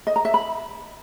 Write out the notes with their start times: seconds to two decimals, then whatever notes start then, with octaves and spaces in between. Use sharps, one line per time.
0.07 D#5
0.16 A#5
0.25 E5
0.34 B5